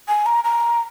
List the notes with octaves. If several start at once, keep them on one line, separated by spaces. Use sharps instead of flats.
G#5
A#5
A#5